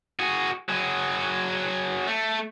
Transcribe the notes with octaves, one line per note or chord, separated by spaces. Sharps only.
F#4 G#4
F#3 G#4
A3